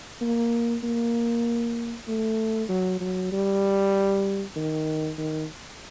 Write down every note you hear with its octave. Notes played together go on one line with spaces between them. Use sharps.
A#3
A#3
A3
F#3
F#3
G3
D#3
D#3